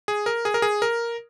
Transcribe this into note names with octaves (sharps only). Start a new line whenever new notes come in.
G#4
A#4
G#4
A#4
G#4
A#4